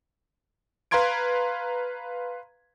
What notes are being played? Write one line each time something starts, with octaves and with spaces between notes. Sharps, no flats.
B4 F5 A#5 C6 G#6 D7